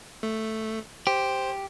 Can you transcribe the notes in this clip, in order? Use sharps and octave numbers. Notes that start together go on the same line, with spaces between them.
A3
G4 C5